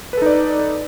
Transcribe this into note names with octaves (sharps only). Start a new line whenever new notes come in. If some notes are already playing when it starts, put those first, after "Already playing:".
D#4 A4 B4 D5